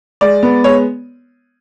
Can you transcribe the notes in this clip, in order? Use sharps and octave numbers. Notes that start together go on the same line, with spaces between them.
G#3 D5
B3
G#3 C#5